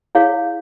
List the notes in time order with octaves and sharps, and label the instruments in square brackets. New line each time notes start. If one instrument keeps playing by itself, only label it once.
[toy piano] E4 G#4 C#5 F5